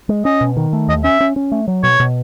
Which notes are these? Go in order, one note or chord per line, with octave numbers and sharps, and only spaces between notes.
G#3
C#4 D#5
B2
D#3
A3
D#2 D#5
C#4 E5
C#4
C#4
A3
F#3
B2 C#5
B2